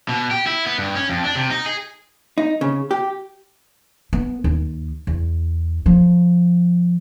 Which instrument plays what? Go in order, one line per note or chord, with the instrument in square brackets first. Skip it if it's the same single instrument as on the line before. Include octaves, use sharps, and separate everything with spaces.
[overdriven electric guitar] B2
G4
E4
B3
G2
C#4
F2
D4
C3
D#4
G#4
[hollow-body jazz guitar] D#4
C#3
G4
[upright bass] B3
D#2
E2
F3